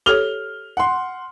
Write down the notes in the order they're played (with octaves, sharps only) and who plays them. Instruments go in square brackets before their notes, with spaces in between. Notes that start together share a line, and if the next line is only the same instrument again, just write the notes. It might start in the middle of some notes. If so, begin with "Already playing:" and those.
[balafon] G4 A4 C#5 [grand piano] F6 F7 G7
[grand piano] F#5 C6